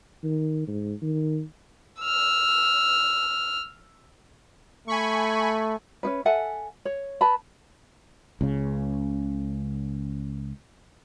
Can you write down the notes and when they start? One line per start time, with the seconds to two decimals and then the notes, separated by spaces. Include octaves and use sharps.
0.24 D#3
0.68 G#2
1.02 D#3
2.01 E6 F6
4.88 A3 G#5 B5 C#6
6.03 C#4 D#4 B4
6.25 A4 E5 F#5 G#5
6.85 C#5
7.21 B4 A5 B5
8.41 C#2 C#3